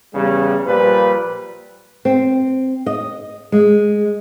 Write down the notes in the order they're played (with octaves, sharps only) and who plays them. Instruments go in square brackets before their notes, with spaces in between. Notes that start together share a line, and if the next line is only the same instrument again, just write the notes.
[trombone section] E2 C#3 G3
A#2 F3 G3 B4
[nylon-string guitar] C4
D#5
G#3